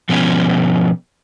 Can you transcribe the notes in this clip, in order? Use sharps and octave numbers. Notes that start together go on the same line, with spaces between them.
B2 F3 B3 C#4